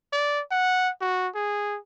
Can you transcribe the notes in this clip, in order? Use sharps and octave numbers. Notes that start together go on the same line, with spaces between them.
D5
F#5
F#4
G#4